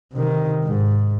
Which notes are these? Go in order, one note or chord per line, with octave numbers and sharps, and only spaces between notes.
C3 D#3
G#2